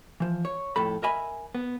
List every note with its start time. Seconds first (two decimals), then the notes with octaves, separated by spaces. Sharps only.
0.20 E3 F3
0.45 C#5
0.76 F2 A2 A4 B5
1.02 A#4 D#5 E5 G#5 B5
1.55 B3